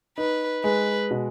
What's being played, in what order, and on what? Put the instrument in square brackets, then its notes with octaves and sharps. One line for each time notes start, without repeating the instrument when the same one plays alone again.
[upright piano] D#4 [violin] B4
[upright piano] G#3 [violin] B4
[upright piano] B2